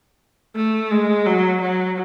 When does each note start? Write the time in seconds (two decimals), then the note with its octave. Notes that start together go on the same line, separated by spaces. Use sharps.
0.55 A3
0.91 G#3
1.26 F#3
1.61 F#3